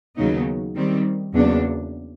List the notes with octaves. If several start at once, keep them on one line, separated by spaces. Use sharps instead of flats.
D#2 C#3 F#3 B3 D#4
D#3 G3 C4
E2 C#3 F#3 A#3 D4